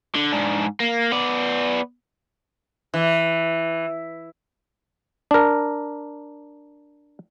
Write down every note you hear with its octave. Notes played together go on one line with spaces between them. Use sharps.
D3
G#2 D4
A#3
B3 D5
E3
D4 A#4